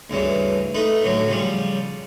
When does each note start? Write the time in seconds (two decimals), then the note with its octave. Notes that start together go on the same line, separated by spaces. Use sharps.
0.10 D2 G2 C#3 E3
0.74 A3 D#4 B4
1.02 A2 D3 F#3
1.28 C#3 F3 G3